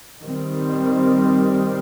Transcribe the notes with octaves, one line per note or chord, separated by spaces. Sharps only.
D#3 G3 C4